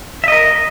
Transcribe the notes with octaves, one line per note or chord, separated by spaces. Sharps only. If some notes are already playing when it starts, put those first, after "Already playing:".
A#4 D#5 E5